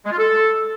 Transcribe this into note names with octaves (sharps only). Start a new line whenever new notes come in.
G#3
F4
A4